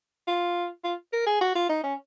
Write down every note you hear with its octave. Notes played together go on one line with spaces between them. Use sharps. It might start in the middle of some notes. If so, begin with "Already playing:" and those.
F4
F4
A#4
G#4
F#4
F4
D#4
C#4